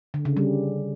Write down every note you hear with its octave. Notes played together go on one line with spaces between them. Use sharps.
D3
C#3
G3